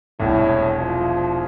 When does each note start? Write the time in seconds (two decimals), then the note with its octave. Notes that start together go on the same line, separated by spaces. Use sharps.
0.20 E1 C2 A2
0.80 F3